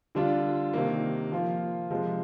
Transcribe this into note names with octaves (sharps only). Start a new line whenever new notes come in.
D3 G3 D4 F4
C3 D#3 A#3
F3 A#3 F4
C3 F3 G#3